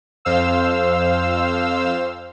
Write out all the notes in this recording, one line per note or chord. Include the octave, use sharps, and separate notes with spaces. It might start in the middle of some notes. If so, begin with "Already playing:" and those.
F2 C5 F5 E6